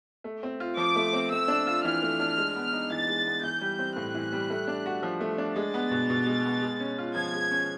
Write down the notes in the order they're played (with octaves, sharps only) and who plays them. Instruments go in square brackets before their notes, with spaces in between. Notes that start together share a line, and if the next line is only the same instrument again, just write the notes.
[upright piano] A3
C4
F4
[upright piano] F3 [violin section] D6
[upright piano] A3
C4
[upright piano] A3 [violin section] E6
[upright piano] D4
F4
[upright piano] E3 [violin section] F6
[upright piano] A3
D4
G#3
B3
D#4
[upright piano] E3 [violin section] A6
[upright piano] G#3
B3
[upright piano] E3 [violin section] G6
[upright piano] G3
C4
[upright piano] A2 [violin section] F#6
[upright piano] E3
G3
A3
D4
F#4
F3
A3
D4
[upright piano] G#3 [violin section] A6
[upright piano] B3
B2
B2
G#3
B3
G#3
C#4
F4
[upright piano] F3 [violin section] G#6
[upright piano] G#3
C#4